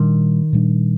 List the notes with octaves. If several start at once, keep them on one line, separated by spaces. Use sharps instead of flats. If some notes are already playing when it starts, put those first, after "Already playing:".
Already playing: A#2 D#3 G3 D4
A#2 G3 D4